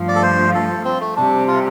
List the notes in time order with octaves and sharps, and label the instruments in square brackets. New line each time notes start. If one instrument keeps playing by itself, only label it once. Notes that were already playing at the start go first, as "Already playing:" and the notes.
Already playing: [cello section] G2 F3 A3 F4
[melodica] D5
A4
C5
A4
C4
A3
[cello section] C3 G3 C4 G4 [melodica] D4
[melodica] F4